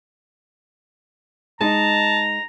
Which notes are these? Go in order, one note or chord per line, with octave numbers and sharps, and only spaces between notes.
G#3 D#4 A5 A#5